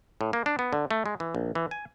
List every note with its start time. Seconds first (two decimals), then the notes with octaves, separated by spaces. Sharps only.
0.21 A2
0.33 A#3
0.46 D4
0.59 B3
0.73 D3
0.91 A3
1.06 G#3
1.20 E3
1.35 A#1
1.55 E3
1.71 G#5